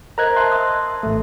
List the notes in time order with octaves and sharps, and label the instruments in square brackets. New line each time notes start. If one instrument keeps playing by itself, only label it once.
[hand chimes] A#4 C5 D#5 [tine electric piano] A#5 F#6 G#6
[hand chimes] E5 A5 [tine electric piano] C6 F#6
[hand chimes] E5 D#6
[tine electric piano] A1 A3